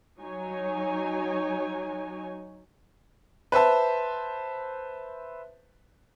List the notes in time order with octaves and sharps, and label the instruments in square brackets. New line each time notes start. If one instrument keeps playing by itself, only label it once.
[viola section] F#3 D#4 C#5 G#5
[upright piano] B4 C5 E5 A5